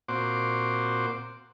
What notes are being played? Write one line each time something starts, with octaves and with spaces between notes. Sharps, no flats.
A#2 C4 F#4 C5 D6